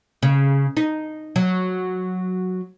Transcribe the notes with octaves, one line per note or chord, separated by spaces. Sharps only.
C#3
D#4
F#3